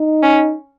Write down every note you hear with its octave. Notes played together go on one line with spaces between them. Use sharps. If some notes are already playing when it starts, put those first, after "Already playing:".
Already playing: D#4
C#4